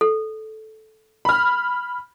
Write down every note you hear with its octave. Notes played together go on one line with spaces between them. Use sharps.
A4
B5 F6